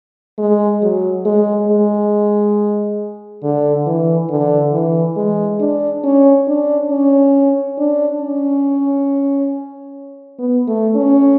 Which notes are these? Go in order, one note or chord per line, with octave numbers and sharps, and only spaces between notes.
G#3
F#3
G#3
G#3
D3
E3
D3
E3
G#3
D4
C#4
D4
C#4
D4
C#4
B3
A3
C#4